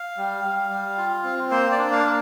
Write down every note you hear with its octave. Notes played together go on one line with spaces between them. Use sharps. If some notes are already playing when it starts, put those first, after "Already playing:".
Already playing: F5
G3
G3
G3
F4
C4
A#3 C5
D5
D4
F5
A#3